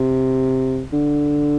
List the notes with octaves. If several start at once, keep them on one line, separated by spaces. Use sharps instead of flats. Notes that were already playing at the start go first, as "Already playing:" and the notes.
Already playing: C3
D3